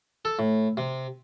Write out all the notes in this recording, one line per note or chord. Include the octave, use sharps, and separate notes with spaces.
A4
A2
C3